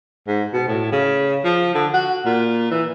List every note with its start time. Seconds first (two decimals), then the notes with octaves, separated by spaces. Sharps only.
0.28 G#2
0.53 B2
0.67 A2
0.92 C#3
1.44 F3
1.74 D3
1.94 F#4
2.25 A#2
2.71 E3